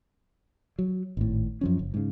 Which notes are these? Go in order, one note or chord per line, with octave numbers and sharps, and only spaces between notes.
F#3
G#1 A2
F#2 F3 C#4
F#1
G#2 C#3